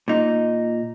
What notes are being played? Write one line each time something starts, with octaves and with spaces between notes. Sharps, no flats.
A#2 D#4